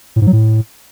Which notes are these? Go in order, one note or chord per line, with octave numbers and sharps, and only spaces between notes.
A2
G#2
F#3
A2